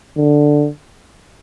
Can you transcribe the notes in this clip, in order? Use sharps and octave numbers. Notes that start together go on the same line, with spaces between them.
D3